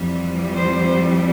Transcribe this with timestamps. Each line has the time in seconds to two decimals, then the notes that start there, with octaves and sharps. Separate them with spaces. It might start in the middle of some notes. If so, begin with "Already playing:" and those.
Already playing: F2 E3 G3
0.52 C5